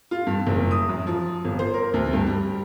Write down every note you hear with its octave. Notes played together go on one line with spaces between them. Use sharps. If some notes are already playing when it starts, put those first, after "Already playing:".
F4
G2
F#1
D#6
F#2
F3
G1
C5
A#4
D2
G2
G3